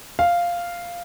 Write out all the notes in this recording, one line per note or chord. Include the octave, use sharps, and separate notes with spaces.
F5